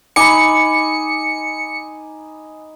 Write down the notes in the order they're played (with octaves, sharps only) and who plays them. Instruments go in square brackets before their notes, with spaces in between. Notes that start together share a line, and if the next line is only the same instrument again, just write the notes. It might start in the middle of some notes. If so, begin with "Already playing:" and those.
[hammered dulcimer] D#4 B5 [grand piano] G#5 D6 [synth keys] C#7